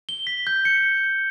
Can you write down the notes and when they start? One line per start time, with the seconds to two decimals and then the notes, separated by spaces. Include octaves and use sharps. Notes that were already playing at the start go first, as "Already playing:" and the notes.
0.09 G7
0.27 B6
0.47 G6
0.65 C#7